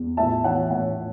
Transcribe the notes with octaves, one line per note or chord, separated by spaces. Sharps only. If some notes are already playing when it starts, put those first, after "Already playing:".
Already playing: E2
A2 E5 A5
E3 C#5 F#5
A2 C#5 F#5